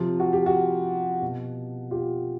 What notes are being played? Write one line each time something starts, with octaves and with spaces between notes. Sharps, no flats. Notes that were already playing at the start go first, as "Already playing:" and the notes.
Already playing: C3 F3 F4
F#4
G4
F#4
B2
F4 G4